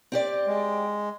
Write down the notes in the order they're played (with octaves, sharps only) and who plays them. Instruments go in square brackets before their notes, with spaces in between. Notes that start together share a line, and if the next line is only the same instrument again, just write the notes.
[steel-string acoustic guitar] C4 G4 D5
[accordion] G#3